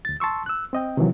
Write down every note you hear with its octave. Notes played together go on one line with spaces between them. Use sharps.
D2 A6
A5 C6 C#6 E6
E6 F#6
C4 D#5 G5
C3 D#3 E3 F#3